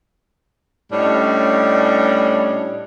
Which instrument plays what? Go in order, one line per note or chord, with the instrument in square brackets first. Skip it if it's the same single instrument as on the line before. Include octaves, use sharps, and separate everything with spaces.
[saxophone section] A2 G3 C#4 D4 C#5 D#5